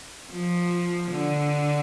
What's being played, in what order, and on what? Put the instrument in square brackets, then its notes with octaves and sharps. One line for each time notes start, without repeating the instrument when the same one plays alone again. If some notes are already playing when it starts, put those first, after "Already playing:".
[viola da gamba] F3
D3